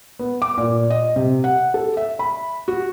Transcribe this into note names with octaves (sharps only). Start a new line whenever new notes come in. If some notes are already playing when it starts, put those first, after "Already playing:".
B3
D6
A#2
D#5
C3
F#5
A4
E5
B5
F#4